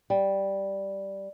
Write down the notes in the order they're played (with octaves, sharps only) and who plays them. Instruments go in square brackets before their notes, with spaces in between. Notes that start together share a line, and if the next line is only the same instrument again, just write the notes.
[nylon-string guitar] G3